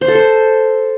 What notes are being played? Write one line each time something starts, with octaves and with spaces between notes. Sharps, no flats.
C5
A4
C5